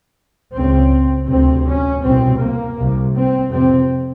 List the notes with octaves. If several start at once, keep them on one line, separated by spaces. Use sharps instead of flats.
C#2 C#3 C4
D2 C3 C4
C#4
C2 B2 C4
A#3
C2 C3
C4
F2 C3 C4